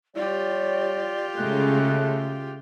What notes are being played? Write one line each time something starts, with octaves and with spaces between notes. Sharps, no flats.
G3 F4 G4 C#5 D5
C#3 G#3 A3 A4 F#6